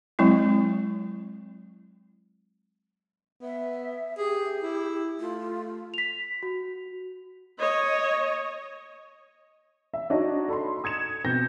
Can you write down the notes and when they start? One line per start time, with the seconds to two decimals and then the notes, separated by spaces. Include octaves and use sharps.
0.19 F#3 G#3 C4 E4
3.41 B3 E5
4.18 G4 G#4
4.63 E4
5.20 A3 F4
5.94 B6 F7
6.43 F#4
7.59 C#5 D#5
9.94 E5
10.10 D4 D#4 F#4 C#5 D#5
10.48 A4 B5 C6
10.84 D#6 G#6 C#7 E7
11.25 B2 C4 G6 A#6